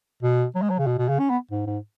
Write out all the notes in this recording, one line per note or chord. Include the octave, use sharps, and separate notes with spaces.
B2
F#3
G#3
F#3
C#3
B2
B2
C#3
C#4
B3
G#2
G#2